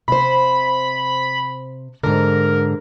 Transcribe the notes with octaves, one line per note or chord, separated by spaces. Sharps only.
C3 C5 B5
G#2 D3 A#4